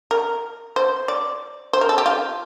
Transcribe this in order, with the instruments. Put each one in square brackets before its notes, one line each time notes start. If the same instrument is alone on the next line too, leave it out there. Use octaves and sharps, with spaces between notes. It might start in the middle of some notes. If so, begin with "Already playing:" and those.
[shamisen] A#4
C5
D5
C5
A#4
A4
G4
F4